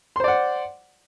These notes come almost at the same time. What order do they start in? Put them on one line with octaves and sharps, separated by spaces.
C6 C5 D5 F#5